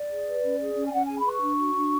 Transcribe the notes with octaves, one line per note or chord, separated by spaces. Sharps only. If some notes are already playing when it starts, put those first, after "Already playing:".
Already playing: D5
G#4
B4
C#4
G#4
C#4
G#5
C#4 F#5
G#4 G#5
B5
B4
C#6
D4
F#4
D4